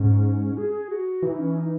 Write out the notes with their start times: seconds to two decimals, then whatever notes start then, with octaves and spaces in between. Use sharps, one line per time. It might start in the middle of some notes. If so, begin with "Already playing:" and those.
Already playing: G#2 C#4
0.58 G#4
0.90 F#4
1.22 E3 D#4
1.39 C#4
1.56 D#4